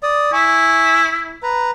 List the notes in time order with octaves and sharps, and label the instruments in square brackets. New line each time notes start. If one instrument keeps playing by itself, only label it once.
[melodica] D5 D#6
[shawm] E4 [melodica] G#5 C#6
[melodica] B4 A#5